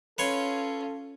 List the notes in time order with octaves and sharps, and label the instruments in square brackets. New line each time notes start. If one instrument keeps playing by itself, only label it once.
[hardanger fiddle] C#4 F4 [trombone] A4 [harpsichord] B4 C#5 C6